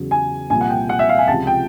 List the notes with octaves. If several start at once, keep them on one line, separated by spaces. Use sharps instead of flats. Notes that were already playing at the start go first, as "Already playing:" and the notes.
Already playing: E2 C#3 F#3
G#5
C2 A#2 F3 G#5
F#5
G5
F#5
E5
F5
G#5
C#2 C3 F3 A5
G5